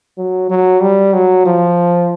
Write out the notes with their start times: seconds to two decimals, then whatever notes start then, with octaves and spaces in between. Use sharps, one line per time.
0.18 F#3
0.50 F#3
0.82 G3
1.13 F#3
1.46 F3